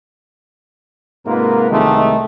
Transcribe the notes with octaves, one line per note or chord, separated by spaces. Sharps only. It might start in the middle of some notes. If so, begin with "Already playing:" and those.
G#2 C3 A#3 F4 A#4 B4
C2 C3 D#3 G#3 A3